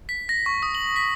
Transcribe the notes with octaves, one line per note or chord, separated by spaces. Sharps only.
B6
A#6
C#6
D#6
F#7
B6